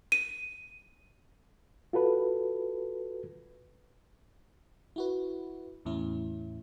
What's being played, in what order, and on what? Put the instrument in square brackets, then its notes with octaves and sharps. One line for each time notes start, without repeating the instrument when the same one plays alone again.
[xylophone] D#7
[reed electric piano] F4 F#4 A4 B4
[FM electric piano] E4 F#4 B4
E2 A2 C#4 E4